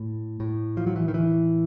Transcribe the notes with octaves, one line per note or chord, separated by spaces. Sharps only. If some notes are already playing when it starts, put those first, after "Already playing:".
Already playing: A2
A2
F3
F#3
E3
D#3
E3